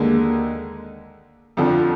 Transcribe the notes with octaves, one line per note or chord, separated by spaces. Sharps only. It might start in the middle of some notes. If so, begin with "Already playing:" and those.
Already playing: D#2 D3 G#3
F2 D3 F3